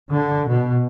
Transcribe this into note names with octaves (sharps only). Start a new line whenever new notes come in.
D3
B2